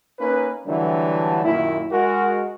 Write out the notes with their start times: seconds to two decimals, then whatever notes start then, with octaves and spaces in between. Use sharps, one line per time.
0.19 A#3 C#4 D#4 B4
0.66 D3 E3 F#3 G3 A3 D4
1.45 F#2 A#2 D#3 A#3 E4
1.92 G#3 F#4 A#4